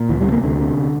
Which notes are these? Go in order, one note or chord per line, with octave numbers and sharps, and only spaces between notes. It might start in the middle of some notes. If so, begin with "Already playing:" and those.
Already playing: A#2
D2 E3
G3
C3
A#3
D2 D3
C3